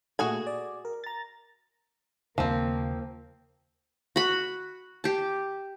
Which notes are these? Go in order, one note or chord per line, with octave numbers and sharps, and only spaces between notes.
A#2 A3 F#4 G#4 G#5
D5
A#4
A#5 A6
D#2 C#3 F3 A#3 C4
F#4 B5
G4 A5